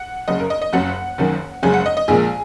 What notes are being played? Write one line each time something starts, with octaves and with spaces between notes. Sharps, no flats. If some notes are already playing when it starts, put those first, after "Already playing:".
Already playing: F#5
F#1 F#2 C#3 D#5
A#4
D#5
D#5
F#1 F#2 F#3 F#5
F#1 F#2 D#3
F#1 F#2 C#3 G#3 G#5
F#5
D#5
D#5
A#1 A#2 G#3 G#4